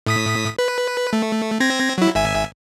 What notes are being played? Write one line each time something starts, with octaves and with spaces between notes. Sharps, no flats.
A2 D#6 B6
B4
A3
C4 G#6 A#6
F#3 E4
G#1 E5 G#5